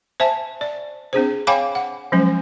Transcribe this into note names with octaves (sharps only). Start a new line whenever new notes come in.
C5 E5 G#5 A5
D5
C4 D4 G#4 C5
C#5 F5 G5 G#5 B5 D6
F#5
F3 F#3 G#3 C#4